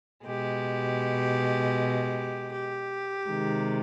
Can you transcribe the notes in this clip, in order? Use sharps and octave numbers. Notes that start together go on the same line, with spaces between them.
B2 G#3 G4
G4
C3 D#3 G#3